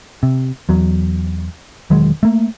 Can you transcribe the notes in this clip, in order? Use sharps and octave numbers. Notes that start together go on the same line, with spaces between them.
C3
E2 F#3
E1 D#3 F#3 G#3
A3 A#3